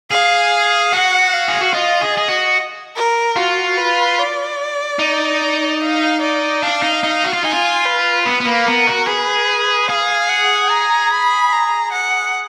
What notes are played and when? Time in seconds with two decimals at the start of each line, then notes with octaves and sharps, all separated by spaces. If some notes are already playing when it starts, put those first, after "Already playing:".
0.10 G#4 F5
0.92 F#4 F#5
1.34 F5
1.48 G#4
1.61 F#4
1.73 F4 D#5
2.01 G#4
2.17 G#4
2.28 F#4
2.96 A#4
3.36 F4 F#4
3.77 B4
4.19 D5
4.99 D#4
5.82 F5
6.21 D5
6.62 D4 F5
6.82 D#4
7.03 D#4
7.24 F#4
7.33 F4
7.43 D#4 G#5
7.52 F4
7.85 B4
8.25 B3 B4
8.41 B3
8.45 A#3
8.67 B3 A#4
8.87 F#4
9.08 G#4 B4
9.88 G#4 F5
10.29 F#5
10.70 A#5
11.10 B5
11.52 A#5
11.92 F#5